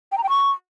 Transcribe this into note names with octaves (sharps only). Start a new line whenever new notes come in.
G5
A#5
G5
C#6